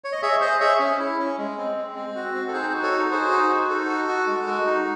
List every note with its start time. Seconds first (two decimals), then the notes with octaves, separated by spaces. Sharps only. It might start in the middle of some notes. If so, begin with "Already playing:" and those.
0.04 C#5
0.12 D#5
0.22 G#4 C#5 E5
0.41 G#4 C5 D#5
0.60 G#4 C#5 E5
0.79 C#4
0.99 E4
1.18 C#4
1.38 G#3
1.58 C4
1.77 G#3
1.96 C4
2.15 F#4
2.34 C4
2.48 A4
2.53 D#4 G#4 C5
2.73 F#4
2.83 A4 C#5
2.92 D#4
3.11 F#4 G#4 C5
3.31 D#4
3.50 F#4
3.69 D#4 A4
3.89 F#4
4.08 F#4
4.27 G#3
4.47 F#4
4.66 D#4